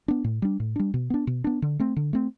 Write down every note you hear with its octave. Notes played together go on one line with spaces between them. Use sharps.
B3 D4
A2
G3 D4
A2
G3 D4
B2
B3 D4
B2
B3 D4
D3
A3 C4
D3
A3 C4